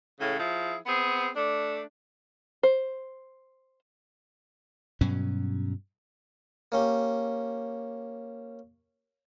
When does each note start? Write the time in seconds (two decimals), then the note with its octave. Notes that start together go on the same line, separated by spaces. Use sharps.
0.18 A2 C#3
0.39 F3 E4 G#4
0.86 B3 C4 G#4
1.35 A3 D4
2.63 C5
5.01 G2 B2 F#3 C#4
6.72 A#3 C#4 G4